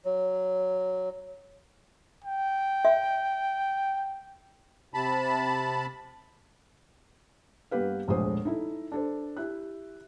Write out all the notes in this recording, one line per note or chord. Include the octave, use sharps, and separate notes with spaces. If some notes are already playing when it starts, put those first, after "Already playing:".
F#3
G5
E5
C3 A5 B5
G2 A#3 B3 G4 B4 F5
E1 A#1 G#3 A3 C5 D#6
D#4 E4 A4
D4 A4 C5
E4 G4 F#6